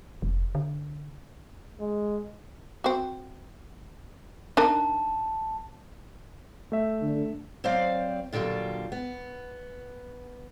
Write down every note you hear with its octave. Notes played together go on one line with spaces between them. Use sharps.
F1
D3
G#3
C4 F#4
D4 D#4 A#4 A5
A3 E5
D3
F#3 C4 C5 D5 F5
A#2 D3 F#3 G3 F4
B3